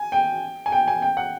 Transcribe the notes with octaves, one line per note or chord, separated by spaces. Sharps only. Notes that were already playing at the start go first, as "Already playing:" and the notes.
Already playing: G#5
G5
G#5
G5
G#5
G5
F#5